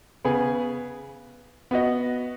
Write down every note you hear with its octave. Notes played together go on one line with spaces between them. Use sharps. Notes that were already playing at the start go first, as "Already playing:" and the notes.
C#3 B3 G#4 B4
B3 F#4 D#5